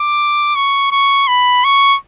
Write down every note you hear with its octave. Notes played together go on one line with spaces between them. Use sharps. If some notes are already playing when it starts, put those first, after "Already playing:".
Already playing: D6
C#6
C#6
B5
C#6